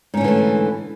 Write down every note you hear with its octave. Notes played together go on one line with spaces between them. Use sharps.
G#2 D3 E3 A3 C#4